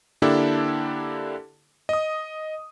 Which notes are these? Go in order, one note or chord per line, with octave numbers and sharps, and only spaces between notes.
D3 A#3 D4 E4 G4 A4
D#5 D#6